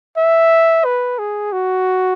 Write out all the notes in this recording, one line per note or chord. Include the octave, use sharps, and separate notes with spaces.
E5
B4
G#4
F#4